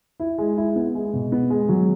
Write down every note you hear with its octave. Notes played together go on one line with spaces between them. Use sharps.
E4
G#3
E4
B3
G#3
B2
B3
G#3
F#3